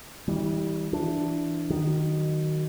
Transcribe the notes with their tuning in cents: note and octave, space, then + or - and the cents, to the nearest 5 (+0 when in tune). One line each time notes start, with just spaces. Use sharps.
E3 -40 G3 +0
E3 +10 D4 +0
D#3 -15 F#3 +15